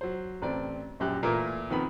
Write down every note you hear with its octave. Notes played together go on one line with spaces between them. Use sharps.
F#3 C5
A1 C4 D5
A#1 F#2 G4 F#6
A#2 E3 A3 A#3 A#4
F2 D#3 B3 B5